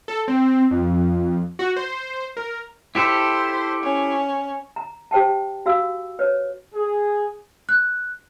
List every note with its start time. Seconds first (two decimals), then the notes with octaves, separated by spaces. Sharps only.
0.08 A4
0.28 C4
0.71 F2
1.59 F#4
1.76 C5
2.37 A#4
2.95 E4 G4 A4 C5
3.83 C#4
4.76 A#5
5.11 G4 C5 G5 A5
5.66 F#4 F5 E6
6.19 B4 C#5
6.74 G#4
7.69 F#6